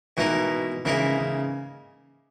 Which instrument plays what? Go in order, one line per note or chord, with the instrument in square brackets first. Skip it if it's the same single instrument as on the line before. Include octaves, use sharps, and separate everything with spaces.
[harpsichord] G#2 E3 A#3 D#4 [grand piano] B2
[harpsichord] G#2 E3 A#3 D#4 [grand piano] C#3
[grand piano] C#3